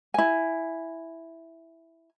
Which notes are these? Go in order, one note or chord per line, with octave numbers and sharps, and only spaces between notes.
E4 G#5